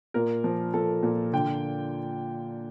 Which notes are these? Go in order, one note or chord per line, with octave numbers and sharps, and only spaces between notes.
A#2 A#4
F3
F3 A4
A#2
D3 G5